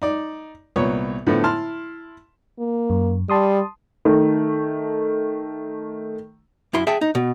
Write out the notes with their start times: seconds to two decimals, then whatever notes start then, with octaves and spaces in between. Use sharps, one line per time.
0.02 D#4 D5
0.76 C2 A#2 B3 C#5
1.27 A2 D3 F3 A3 B3
1.44 E4 A5 C6 F6
2.59 A#3
2.90 F#2
3.30 G3 A5 C6 D#6
4.05 D#3 A3
6.73 F#2 E4 C6
6.87 G#4 E5 G5 A5
7.01 D#4
7.15 B2